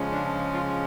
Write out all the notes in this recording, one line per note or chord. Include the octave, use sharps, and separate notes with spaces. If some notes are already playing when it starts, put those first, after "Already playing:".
Already playing: C#3 F3 G#3 C#4
D4
F4